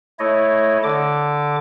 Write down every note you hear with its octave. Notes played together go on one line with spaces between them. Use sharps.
A3 E4 C#5 D#5
D3 D6